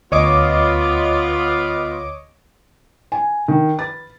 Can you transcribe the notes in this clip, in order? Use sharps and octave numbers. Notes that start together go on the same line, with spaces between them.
D2 B3 F4 C#5 D#5 D6
G#5
D#3
B4 A6